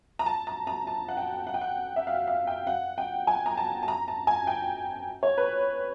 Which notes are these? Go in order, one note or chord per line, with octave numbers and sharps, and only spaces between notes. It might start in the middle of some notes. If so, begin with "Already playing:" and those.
A#5
A5
A#5
A#5
A5
F#5
G5
F#5
G5
F#5
E5
F5
F5
G5
F#5
G5
G#5
A#5
A5
A5
A#5
A5
G#5
G5
C#5
B4